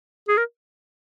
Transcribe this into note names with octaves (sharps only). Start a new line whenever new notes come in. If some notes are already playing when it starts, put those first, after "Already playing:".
G#4
A#4